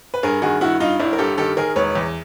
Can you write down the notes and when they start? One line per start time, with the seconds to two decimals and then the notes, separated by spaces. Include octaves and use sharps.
0.14 B4
0.23 G2 G#4 A#4
0.42 D#3 F#4 G#4
0.61 G2 E4 F#4
0.80 G2 D#4 F4
1.00 G1 D4 E4
1.13 A#4
1.18 G2 G4 A4
1.38 D#3 G4 A4
1.57 D#3 G#4 A#4
1.76 E1 B4 C#5
1.95 E2